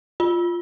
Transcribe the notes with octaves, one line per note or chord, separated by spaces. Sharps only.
F4